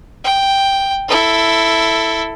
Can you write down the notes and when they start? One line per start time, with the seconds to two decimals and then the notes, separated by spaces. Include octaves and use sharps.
0.24 G5
1.08 E4 A4